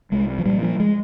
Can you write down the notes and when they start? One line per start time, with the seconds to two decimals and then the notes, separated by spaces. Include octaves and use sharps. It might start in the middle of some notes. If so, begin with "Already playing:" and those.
0.12 C2 G#3
0.39 F3
0.46 A#2 G3
0.63 F3
0.80 G#3